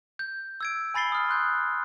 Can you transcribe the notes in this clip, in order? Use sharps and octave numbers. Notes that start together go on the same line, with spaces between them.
G6
E6 G#6 D7
G#5 B5 A6 C7 G7
D#6 F6
C6 F#6 G6